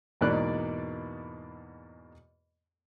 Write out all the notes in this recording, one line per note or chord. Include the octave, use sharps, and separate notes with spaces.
E2 G#2 B2 A#3 D5 F#6